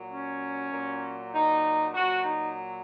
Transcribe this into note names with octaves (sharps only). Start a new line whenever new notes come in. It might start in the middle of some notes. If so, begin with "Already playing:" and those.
Already playing: A#2 F#3
C#4
A#2 F#3
D#4
A#2 F#3 F#4
D#4